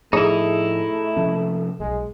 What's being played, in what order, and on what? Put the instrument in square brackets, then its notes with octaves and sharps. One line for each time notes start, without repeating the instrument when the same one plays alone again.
[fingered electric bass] A2 F3 [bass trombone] A3 [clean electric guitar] D#4 E4 [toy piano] G#4
[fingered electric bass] C3 F3 C#4
[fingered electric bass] E1 B1 [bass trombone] G#3